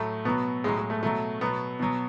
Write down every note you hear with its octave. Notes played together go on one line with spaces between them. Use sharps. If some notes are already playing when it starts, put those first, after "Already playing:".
Already playing: A2 F#3 A3
B2 F#3 B3
A2 F#3 G#3
G#3
A3
B2 F#3 A3
B2 F#3 B3
B2 F#3